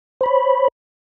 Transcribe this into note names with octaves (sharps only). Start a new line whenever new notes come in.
C5 C#5 B5